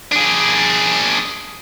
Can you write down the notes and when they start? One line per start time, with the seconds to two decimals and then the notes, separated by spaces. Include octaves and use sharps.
0.12 D4 G#4